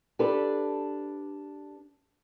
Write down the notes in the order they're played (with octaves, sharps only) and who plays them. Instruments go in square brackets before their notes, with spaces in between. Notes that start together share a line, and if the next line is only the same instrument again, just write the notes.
[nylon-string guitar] D4 G4 A4 B4